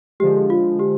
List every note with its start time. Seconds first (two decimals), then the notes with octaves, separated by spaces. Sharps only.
0.20 D3 F3 G#3 G4
0.50 F4
0.79 G4